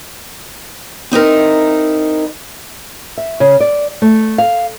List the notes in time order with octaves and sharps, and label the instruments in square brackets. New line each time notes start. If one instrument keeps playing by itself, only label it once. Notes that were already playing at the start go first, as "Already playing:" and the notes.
[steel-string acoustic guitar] C4 D#4 E4 A#4
[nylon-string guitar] E5
C#3
D5
A3
F5